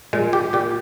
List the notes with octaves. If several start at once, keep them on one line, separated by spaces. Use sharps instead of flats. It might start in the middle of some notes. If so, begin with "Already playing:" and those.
A#2 G#3
G4
A#2 G4